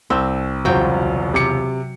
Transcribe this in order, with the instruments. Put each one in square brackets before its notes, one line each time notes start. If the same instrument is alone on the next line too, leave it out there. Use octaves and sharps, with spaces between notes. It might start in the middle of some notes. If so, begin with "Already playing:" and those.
[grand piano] C2 [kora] C4 [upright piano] E6
[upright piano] E1 C#2 C5 [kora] F#3 G5
[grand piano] C3 D6 C#7